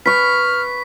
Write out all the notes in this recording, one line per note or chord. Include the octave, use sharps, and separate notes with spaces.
B4 C#6 F6 B6